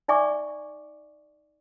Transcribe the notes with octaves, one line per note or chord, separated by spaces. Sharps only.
D#4 D5 E5 G#5 C#6 D6